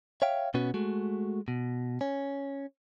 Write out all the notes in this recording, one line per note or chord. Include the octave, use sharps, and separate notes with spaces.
C#5 E5 F5 G5
B2 B3 C#4 F#4
G#3 A3 F#4
B2
C#4